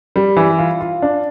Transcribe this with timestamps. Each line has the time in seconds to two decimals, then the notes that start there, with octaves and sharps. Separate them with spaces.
0.16 G3
0.37 E3
0.59 F4
0.80 F4
1.02 D4